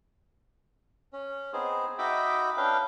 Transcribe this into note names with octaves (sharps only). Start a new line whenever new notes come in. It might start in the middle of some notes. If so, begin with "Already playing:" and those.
C#4
B3 C4 D#4 G#4 C5
D#4 F#4 E5 G5 B5 D6
C#4 D4 B4 F5 G5